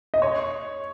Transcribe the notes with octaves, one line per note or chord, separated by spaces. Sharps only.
D#5
C#5